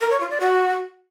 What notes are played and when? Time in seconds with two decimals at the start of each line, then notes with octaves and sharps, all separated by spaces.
0.01 A#4
0.11 C#5
0.20 F4
0.30 D5
0.40 F#4